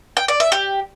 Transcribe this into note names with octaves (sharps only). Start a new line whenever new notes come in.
G5
D5
E5
G4